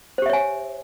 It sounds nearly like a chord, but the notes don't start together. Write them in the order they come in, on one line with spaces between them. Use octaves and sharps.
C5 G4 E5 C#5 G#5